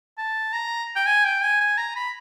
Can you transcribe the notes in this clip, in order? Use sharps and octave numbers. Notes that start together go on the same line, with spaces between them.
A5
A#5
G5
G#5
G5
G#5
G#5
A#5
B5